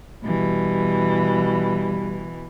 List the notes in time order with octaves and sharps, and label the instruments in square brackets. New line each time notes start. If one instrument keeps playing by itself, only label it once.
[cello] B2 E3 [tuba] G3